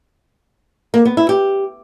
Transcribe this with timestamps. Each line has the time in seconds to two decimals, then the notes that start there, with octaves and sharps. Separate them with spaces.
0.94 A#3
1.05 B3
1.17 E4
1.29 G4